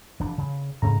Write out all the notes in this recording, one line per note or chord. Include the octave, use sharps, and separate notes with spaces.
F1 E3 D4
C#3
G#2 C#3 A3 A#5